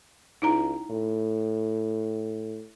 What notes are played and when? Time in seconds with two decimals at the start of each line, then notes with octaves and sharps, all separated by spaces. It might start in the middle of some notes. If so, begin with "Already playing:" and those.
0.42 C#2 D#4 E4 A#5
0.90 A2